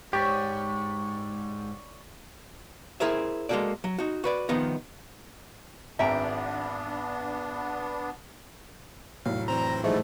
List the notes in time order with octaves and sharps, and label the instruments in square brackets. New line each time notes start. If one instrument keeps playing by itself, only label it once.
[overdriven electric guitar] G#2 [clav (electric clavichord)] G4 [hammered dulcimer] C#5 D5 B5
[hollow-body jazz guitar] E4 G#4 A#4 C5 E5
G#3 A#3 F4 F#4 A4 D5
F#3
D#4 F#4
F#4 B4 D5
C2 D#3 F3 B3 D#5
[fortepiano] G#1 [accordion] B3 D4 [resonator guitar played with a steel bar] E5 G5 A#5
[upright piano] F1 A2 F#3 [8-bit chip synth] F5
[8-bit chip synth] E3 C4 C5 [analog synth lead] A#5
[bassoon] G#2 [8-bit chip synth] E3 F3 G3 [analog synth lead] A3